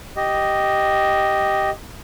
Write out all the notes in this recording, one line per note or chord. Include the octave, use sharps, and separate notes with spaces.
G4 D#5